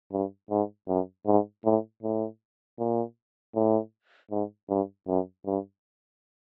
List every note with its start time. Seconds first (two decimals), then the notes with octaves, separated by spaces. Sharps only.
0.12 G2
0.51 G#2
0.88 F#2
1.26 G#2
1.65 A2
2.03 A2
2.79 A#2
3.55 A2
4.31 G#2
4.70 G2
5.08 F#2
5.46 G2